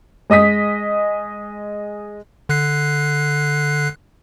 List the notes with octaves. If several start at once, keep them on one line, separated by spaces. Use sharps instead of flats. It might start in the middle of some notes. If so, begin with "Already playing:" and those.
G#3 D#5 D#6 B6
D3 F#6 C7